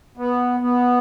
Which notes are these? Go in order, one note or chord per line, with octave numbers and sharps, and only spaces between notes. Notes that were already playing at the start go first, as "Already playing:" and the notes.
B3
B3